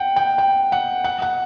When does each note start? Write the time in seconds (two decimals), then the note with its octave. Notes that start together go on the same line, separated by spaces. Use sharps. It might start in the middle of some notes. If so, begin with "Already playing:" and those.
Already playing: F#5 G5
0.16 G5
0.38 G5
0.72 F#5
1.04 F#5
1.22 F#5